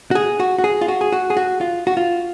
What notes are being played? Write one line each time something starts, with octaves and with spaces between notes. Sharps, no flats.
F#4
G#4
F#4
F#4
G#4
F4
F#4
G#4
F#4
G#4
F#4
F4
F#4
F4